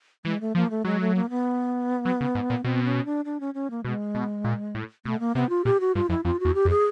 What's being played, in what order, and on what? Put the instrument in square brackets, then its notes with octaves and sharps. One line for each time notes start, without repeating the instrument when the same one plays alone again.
[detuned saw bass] E3 [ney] G#3
[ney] A3
[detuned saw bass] F3 [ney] A#3
[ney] A3
[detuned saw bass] F#3 [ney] G#3
[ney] A3
A#3
B3
[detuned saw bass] F#3
C#3
G#2
A#2
[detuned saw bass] B2 [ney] C4
[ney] C#4
D4
D4
C#4
C#4
A#3
[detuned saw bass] B2 [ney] G#3
[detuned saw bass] B2
A#2
A2
[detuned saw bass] B2 [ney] A3
[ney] A#3
[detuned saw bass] C3 [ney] B3
[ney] F4
[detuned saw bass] A#2 [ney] G4
[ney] F#4
[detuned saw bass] G2 [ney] F4
[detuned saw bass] F2 [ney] E4
[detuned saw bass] F2 [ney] F4
[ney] F#4
[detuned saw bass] E2
[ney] G4
[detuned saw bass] F2
[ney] G#4